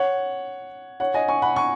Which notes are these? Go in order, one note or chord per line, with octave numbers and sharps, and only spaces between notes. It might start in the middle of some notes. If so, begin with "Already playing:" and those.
Already playing: C#5 F#5
C#5 F#5
D#5 G#5
G#5 C#6
F#5 B5
G#5 C#6